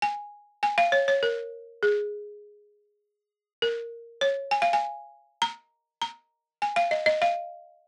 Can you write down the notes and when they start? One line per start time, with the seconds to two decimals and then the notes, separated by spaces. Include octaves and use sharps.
0.02 G#5
0.63 G#5
0.78 F5
0.92 C#5
1.08 C#5
1.23 A#4
1.83 G#4
3.62 A#4
4.21 C#5
4.51 G#5
4.62 F5
4.73 G#5
5.42 A#5
6.02 A#5
6.62 G#5
6.76 F5
6.91 D#5
7.06 D#5
7.22 F5